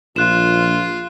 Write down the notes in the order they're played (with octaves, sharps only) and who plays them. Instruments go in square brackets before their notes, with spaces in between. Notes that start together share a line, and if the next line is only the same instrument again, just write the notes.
[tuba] A#1 [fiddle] F4 [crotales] F#6 E7